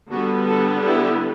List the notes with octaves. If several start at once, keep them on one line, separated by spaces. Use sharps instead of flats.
D3 G3 B3 F#4
F#4 A4
E4 G4